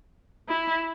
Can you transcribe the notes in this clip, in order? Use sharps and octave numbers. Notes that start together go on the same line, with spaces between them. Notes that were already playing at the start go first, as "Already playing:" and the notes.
E4